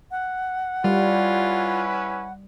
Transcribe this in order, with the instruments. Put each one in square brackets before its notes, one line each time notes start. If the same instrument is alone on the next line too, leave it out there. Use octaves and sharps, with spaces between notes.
[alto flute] F#5
[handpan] G3 [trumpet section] C#4 E4 B4 [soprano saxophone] F4